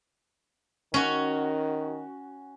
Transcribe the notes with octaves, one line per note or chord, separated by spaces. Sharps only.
D#3 C#4 F#4